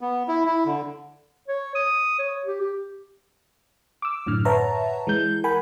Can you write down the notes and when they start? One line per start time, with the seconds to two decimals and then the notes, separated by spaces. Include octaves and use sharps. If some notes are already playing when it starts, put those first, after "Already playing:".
0.01 B3
0.28 E4
0.45 E4
0.66 D3
1.48 C#5
1.75 D#6
2.19 C#5
2.45 G4
2.61 G4
4.02 D6 E6
4.27 F#2 A2 D3 F6
4.45 B4 C#5 E5 F#5 A5 A#5
5.07 E3 G#3 G6
5.44 A#4 F#5 G#5 B5